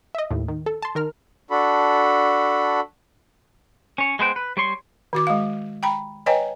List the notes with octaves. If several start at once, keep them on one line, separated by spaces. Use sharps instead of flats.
D#5 E5
D#2 A2
D#3
A4
A5 C6
D#3 A#4 F6
D4 F#4 A4 B5
C#4 C#5
G#3 B3 C5 G5
B4
G3 C#5 C6 C#6
D#3 F#4 D6
G#3 F5
G5 A#5 B5
B4 C#5 D#5 G5 G#5 A#5